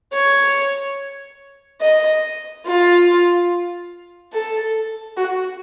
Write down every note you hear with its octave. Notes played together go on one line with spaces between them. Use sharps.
C#5
D#5
F4
A4
F#4